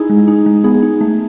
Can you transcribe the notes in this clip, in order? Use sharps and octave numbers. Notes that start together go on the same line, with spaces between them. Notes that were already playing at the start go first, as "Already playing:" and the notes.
Already playing: D#4 E4 G#4
G#3
D#4
G#3
B3 G#4
D#4
A3